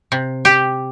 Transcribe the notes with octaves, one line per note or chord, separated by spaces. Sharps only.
C3
G4